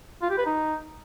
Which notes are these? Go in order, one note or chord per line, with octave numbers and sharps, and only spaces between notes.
F4
G4
B4
D#4